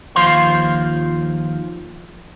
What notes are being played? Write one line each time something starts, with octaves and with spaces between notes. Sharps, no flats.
D#2 F3 C5 F5 C6